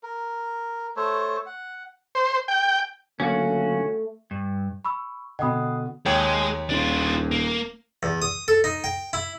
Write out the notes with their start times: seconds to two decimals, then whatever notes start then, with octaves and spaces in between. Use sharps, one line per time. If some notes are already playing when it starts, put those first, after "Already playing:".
0.03 A#4
0.97 A3 A4 C5 C#5
1.46 F#5
2.15 C5
2.48 G5
3.20 D3 F#3 A3 A#3 C#4 F#4 F5
4.31 G2
4.85 B5 C#6 E6
5.39 B2 D3 D#5 F#5 G5 B5 D#6
6.06 D#2 G#3 C#5 G5
6.69 D#1 D4 F4
7.31 A#3
8.03 E2
8.22 D#6
8.48 A4
8.64 D#4
8.84 G5
9.13 E4